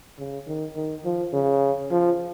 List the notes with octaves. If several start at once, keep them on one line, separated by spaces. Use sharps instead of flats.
C#3
D#3
D#3
F3
C#3
F3